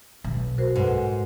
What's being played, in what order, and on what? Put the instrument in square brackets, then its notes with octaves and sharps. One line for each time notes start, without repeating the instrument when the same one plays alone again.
[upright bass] B1
[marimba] F#4 A#4 C5
[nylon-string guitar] G#2 [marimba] A4 B4 F#5